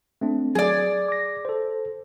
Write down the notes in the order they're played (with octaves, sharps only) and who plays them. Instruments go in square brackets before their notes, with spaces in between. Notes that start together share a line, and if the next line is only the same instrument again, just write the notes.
[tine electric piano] A3 C4 D4
[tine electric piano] F#3 [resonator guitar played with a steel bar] G#4 D5
[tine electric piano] D6 A#6
A4 C5